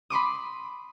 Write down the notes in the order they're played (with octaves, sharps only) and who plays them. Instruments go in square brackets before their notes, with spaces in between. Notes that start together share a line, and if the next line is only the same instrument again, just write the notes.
[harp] B5 C6 D6 D#6